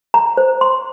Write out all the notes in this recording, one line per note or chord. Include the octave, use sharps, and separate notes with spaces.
A#5
C5
C6